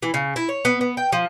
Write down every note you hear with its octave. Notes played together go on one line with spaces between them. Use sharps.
E3
C#3
E4
C#5
B3
B3
G5
F3